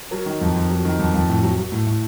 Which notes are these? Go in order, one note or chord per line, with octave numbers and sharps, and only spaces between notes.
F#3 A#4
D#3
F2
F2
F#3
D#3
F2
F2
A2
F#3
F#3
A2
A2